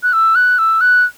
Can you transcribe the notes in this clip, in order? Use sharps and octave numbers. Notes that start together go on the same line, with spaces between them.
F#6
E6
F#6
E6
F#6